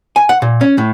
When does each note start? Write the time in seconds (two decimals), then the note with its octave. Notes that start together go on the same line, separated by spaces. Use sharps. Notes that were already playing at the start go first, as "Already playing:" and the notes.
0.16 G#5
0.29 F#5
0.42 A#2
0.61 C#4
0.78 A2